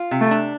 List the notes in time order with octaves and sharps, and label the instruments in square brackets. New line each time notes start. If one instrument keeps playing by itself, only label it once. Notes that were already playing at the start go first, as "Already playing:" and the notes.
Already playing: [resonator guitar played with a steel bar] F4
C3
[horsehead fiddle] A3
[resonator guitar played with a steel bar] D4